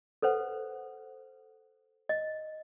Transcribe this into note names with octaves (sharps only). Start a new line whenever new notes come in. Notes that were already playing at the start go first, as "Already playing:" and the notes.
A4 B4 C5 F#5
D#5